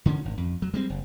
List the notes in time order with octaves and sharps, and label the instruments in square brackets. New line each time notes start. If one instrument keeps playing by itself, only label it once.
[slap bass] D3 D#3 A3 C#4
G#1
F2
F#3
G3 G#3 C4
F#1